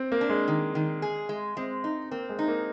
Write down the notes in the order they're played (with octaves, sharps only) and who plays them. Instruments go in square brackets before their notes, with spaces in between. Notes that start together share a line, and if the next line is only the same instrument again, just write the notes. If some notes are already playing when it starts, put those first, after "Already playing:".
Already playing: [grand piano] C4
A#3
[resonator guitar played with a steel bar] D4
[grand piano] G#3
[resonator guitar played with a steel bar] D#3
D#3
G#4
G#3
[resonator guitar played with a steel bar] G#3 [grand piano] C4
[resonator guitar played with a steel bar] D#4
[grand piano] A#3 [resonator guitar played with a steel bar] C4
[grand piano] G#3
[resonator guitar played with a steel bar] D#4
[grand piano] A#3